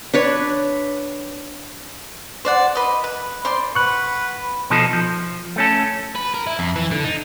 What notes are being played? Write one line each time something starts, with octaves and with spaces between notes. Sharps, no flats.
D4 B4 C#5
C5 D5 F#5
B4 D#5
B4
C5 D5 C6
B4 F#5 C#6 F#6
B2 F3 D#4 A4
F3
A3 C#4 A4
B4
A#4
E4
F2
E3
D3
D#4